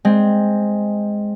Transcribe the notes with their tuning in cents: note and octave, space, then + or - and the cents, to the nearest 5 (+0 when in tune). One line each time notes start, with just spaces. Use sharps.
G#3 +0 C4 +0